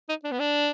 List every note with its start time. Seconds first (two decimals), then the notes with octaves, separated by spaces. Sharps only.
0.09 D#4
0.24 D4
0.32 B3
0.39 D4